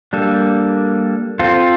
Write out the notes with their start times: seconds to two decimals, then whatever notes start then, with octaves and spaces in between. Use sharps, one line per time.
0.13 G3 A#3 D4 A4
1.39 C4 F4 A4